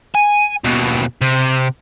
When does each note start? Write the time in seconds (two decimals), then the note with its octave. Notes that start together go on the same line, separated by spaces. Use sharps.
0.15 G#5
0.64 D#2 B2
1.21 C3